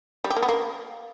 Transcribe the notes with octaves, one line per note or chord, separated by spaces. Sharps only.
G3
G4
A#3
B3
A#3